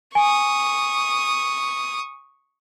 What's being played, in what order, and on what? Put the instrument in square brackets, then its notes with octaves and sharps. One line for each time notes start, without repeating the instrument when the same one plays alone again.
[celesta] G#5 [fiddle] C#6 D#6